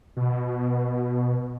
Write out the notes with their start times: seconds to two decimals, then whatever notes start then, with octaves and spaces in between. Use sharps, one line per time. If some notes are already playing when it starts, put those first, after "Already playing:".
0.16 B2